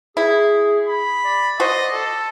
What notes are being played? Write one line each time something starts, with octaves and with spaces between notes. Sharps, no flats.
E4 G#4
B5
D5
F#4 C5 D#5
A4